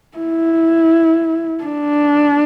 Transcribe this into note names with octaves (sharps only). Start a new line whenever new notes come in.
E4
D4